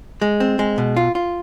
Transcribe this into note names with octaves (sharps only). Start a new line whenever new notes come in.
G#3
C4
G#3
B2
F4
F4